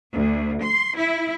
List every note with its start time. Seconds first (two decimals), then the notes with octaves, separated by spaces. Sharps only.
0.14 D2
0.63 C6
0.98 E4